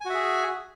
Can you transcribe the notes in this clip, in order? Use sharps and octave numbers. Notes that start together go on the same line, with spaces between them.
F#4 G#4 E5 G#5